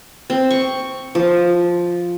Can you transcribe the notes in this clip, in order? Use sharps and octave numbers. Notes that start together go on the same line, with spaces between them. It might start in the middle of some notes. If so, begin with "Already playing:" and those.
C4
C#6
F3